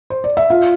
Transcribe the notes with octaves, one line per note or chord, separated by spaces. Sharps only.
C5
D5
E5
F4 F5